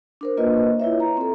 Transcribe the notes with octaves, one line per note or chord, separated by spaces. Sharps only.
D4 A#4 C5
A#3 F4 B4 D#5
E4 F4 C#5 E5
A#5
C4 A4